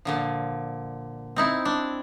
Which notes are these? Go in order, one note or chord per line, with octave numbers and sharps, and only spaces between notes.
A#2 D3 F3
C4 D#4 E4
D4